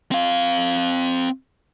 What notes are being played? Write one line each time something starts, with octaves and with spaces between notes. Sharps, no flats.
C4 F5